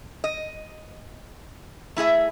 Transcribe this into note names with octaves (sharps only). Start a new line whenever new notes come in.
D#5
A3 E4 G#4 E5